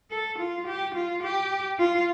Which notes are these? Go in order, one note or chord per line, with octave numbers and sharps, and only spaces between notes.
A4
F4
G4
F4
G4
F4